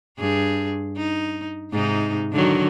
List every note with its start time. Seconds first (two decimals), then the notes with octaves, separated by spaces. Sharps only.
0.18 G2 G#4
0.97 D#4
1.71 G#2 C3 D#4
2.33 D3 D#3 F#3